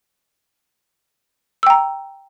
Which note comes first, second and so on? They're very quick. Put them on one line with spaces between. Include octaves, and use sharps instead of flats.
E6 G5 A#5